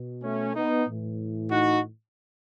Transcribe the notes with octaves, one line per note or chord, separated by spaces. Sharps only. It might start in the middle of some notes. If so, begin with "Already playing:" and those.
Already playing: B2
A3 C#4
B3 D#4
A2 E3
D#4 F#4